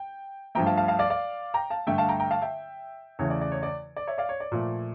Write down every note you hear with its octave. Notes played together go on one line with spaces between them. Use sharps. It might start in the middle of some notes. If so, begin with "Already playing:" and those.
Already playing: G5
G2 F3 A3 G5 A#5
F5 A5
F5 A5
F5 A5
D5 F5
D5 F5
G5 A#5
F5 A5
G2 D3 A3 E5 G5
F5 A5
G5 A#5
G5 A#5
F5 A5
E5 G5
E2 C#3 E3 A3 C#5
D5
D5
C#5
D5
D5
C#5 E5
D5 F5
C#5
D5
A#2 F3 A3